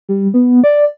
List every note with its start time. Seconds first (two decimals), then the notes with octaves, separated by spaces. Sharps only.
0.09 G3
0.34 B3
0.64 D5